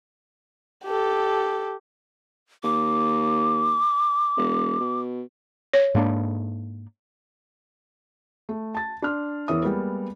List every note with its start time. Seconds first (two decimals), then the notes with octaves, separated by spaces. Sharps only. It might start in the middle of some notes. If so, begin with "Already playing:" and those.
0.84 G4 A4
2.64 D#2 D6
4.37 E1
4.80 B2
5.74 C#5
5.95 G#2 A#3 D4
8.49 A3
8.75 A5 A6
9.02 D4 C6 F6
9.48 E2 E3 A#4 C#5 E5 D#6
9.63 G3 G#3 A#3 B3 A#4